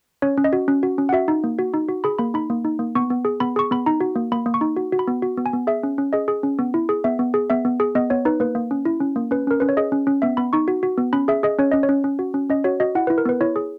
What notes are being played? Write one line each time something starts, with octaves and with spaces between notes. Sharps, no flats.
C#4 C#5
C#4
D#5
F#4
C#4
F#4
C#4
F#5
F#4 E5
D#4
A#3
F#4
D#4
F#4
G#4 B5
A#3 B5
D#4 B5
A#3
D#4
A#3
B3 C#6
B3
G#4
B3 B5
G#4 C#6
B3 B5
D#4 A#5
F#4
A#3
A#3 B5
A#3
C#6
D#4
F#4
F#4
B5
B3
F#4
B3
G#5
B3
G#4 E5
C#4
C#4
G#4 D#5
G#4
C#4
B3
E4
G#4
B3 E5
B3
G#4
B3 E5
B3
G#4
B3 D#5
B3 C#5
D#4 B4
A#3 B4
A#3
C#4
E4
C#4
A#3
C#4 B4
C#4 A#4
C#4 B4
C#5
G#4 D#5
C#4
C#4
B3 E5
B3 B5
D#4 C#6
F#4
F#4
B3
C#4 B5
G#4 E5
G#4 D#5
C#4 C#5
C#4 D#5
C#5
C#4
C#4
F#4
C#4
C#4 D#5
F#4 C#5
F#4 D#5
E4 F#5
B4
E4
A#4
B3 B4
E4 C#5
G#4